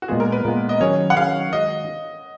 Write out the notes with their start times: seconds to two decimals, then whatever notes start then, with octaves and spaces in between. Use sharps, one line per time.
0.02 F#4
0.08 A#2 G#3 B3 F4 G#4
0.20 A#4
0.32 B4
0.45 A#2 G#3 B3 F4
0.69 D#5
0.80 D#3 F#3 C#4 G#4 C#5
1.10 F#5
1.16 D#3 F#3 C#4 G#4 F5
1.52 D#3 G#3 D#4 F#4 D#5